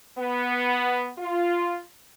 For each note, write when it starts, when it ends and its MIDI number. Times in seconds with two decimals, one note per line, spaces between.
0.18 1.09 59
1.19 1.79 65